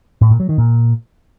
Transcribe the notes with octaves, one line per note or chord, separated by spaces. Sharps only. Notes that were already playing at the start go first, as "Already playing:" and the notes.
A2
A#2
F#3
D#3
A#2